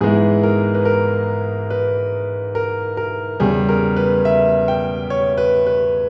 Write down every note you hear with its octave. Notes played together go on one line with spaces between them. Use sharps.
G#2 E3 G#3 B3 E4 G#4
A#4
B4
A#4
B4
A#4
A#4
E2 C#3 G3 G#4
A#4
B4
E5
G5
C#5
B4
B4